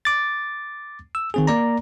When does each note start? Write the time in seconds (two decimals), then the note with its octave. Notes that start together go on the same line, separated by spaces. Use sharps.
0.05 D6 A6
1.15 E6
1.34 D#3 C4 G#4
1.47 A#3 D5 A#5